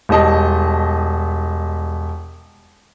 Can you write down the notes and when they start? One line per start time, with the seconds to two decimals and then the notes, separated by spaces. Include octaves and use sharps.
0.09 E1 G3 D#5 A5